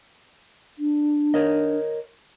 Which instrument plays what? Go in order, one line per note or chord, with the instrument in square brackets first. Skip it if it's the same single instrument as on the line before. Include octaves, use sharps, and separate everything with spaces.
[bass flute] D4
[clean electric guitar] A#4 C#5 D#5